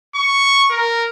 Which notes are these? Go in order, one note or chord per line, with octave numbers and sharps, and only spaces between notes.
C#6
A#4